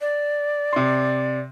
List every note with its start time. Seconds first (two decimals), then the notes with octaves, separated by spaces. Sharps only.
0.01 D5
0.73 C3 C6